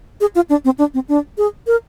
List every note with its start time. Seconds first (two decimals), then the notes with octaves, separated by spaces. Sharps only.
0.21 G#4
0.35 F4
0.50 D4
0.65 C4
0.78 D4
0.94 C4
1.09 D4
1.38 G#4
1.67 A#4